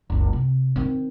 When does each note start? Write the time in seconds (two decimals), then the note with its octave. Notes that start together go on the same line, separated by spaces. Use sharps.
0.10 F#1 C#2
0.33 C3
0.76 D#3 C4